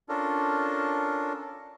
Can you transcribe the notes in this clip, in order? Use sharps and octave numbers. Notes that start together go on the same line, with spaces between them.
C#4 D4 F4 A4 A#4